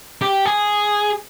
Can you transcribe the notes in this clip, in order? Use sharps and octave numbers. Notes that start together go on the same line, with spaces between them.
G4
G#4